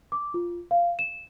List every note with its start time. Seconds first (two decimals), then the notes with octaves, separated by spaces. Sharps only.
0.12 D6
0.34 F4
0.71 F5
0.99 E7